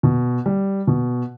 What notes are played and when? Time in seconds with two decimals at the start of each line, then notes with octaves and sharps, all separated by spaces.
0.03 B2
0.46 G3
0.87 B2